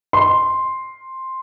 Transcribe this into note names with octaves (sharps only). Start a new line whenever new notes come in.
C6